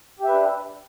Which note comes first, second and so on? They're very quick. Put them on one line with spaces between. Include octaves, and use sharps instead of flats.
G4 E5 B4 D4